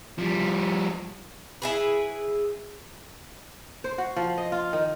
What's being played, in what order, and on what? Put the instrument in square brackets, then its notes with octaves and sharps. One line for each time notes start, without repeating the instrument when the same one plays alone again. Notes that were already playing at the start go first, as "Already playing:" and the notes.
[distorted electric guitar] F3 G3
[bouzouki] E4 G#4 B4
[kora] C5
F#4
F3
D#5
F4
D#3